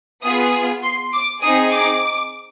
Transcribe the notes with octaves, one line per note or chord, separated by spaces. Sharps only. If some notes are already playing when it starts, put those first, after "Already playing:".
B3 F4 G#4 D#6
C6
D6
C4 D#4 G#4 D#6
D6